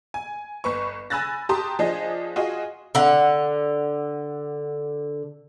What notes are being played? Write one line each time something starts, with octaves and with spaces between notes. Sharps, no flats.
G#5
G1 B4 C#6
G#5 B5 E6 F#6 A6 A#6
G4 A5 A#5 C6 D#6
F3 D4 G#4 D#5
F4 F#4 G#4 D#5
D3 F#5